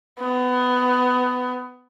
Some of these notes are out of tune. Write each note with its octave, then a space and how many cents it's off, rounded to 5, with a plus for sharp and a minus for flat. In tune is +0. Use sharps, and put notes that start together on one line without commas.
B3 +20